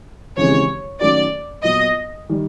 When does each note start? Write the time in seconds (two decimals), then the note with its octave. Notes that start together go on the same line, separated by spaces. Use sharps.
0.37 D#2 C#3 E3 G#3 C4 C#5
1.00 D#3 F#3 A3 C#4 F#4 D5
1.63 A#2 F#3 B3 D#5
2.29 D#3 G3